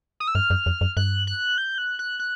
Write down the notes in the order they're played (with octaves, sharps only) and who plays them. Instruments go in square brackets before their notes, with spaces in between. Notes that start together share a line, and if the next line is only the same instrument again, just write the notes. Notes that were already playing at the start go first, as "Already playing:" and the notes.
[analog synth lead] D#6
E6
[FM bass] G2 [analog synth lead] F6
[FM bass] F#2
F2
F#2
[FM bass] G2 [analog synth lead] F#6
[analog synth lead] F#6
G6
F#6
F#6
F#6